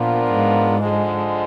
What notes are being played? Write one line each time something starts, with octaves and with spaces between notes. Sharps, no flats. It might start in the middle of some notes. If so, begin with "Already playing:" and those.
Already playing: A#2 F3 B3 D4 F4 A#4
G#2
D3 F3 G#3